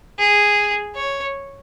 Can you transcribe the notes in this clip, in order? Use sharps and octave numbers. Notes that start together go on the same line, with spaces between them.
G#4
C#5